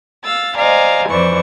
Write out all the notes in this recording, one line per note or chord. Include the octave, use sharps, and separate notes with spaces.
F5 E6 A6
C5 D5 D#5 F5 G#5 A#5
F2 E3 C5 D5 C#6